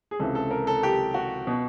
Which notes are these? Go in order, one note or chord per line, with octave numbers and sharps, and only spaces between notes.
G#4
C#2 C3 E3 A4
A4
A#4
A4
G4
F#4
B2